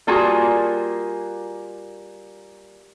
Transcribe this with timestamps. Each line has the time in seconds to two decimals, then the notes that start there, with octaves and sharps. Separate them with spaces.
0.07 G3 A#3 F4 F#4 G#4